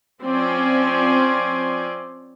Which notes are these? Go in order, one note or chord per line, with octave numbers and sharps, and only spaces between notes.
F3 C4 C#4 D5 G#5 C6